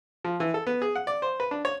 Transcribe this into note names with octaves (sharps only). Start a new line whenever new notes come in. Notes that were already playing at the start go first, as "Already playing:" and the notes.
F3
E3
A4
B3
G#4
F#5
D5
C5
B4
D4
C#5